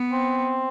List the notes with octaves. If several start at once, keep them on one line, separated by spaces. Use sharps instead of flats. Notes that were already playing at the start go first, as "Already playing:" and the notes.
Already playing: B3
C4